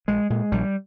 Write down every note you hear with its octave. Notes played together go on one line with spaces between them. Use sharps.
A#1 G#3
A#2 G#3
A#1 G3